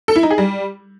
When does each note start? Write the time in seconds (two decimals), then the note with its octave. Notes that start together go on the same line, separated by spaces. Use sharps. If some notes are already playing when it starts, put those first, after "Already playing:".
0.08 A4
0.16 E4
0.23 D#4
0.31 G#4
0.38 G3